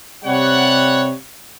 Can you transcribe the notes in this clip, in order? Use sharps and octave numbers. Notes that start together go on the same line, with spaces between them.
C3 G3 C#5 F#5